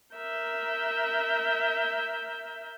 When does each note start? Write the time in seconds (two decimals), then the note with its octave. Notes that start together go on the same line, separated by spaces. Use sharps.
0.15 A#4 E5 G6